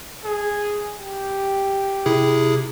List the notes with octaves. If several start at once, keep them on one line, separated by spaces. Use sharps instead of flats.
G#4
G4
C3 E4 G#4